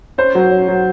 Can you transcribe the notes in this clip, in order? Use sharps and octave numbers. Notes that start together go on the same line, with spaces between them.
C#4 C5
F#3
C#4
F#3